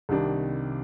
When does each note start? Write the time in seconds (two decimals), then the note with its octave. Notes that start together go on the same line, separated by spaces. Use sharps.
0.09 C2 C3 D#3 G3 D4